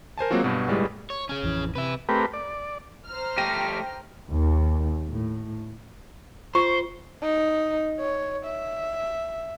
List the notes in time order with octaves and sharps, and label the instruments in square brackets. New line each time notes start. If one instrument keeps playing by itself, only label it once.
[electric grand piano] A#4 C5 G#5 A5
F#3 G#3 A#3 C4 F4 F#4
G2 B2 F#3
G1 A2 G3 G#3 B4
[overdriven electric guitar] C#5
C#4 G#4
[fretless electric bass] A1 F2 E3
[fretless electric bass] C3 [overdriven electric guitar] B4 E5
[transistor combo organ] A3 C4 G4 A#4 B4
D5
[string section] C5 A#5 F6
[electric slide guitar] A3 G4 [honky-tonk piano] G5 A#6 D#7
[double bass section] D#2
A2
[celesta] F4 [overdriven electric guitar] C5 [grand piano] C#6
[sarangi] D#4
C#5
E5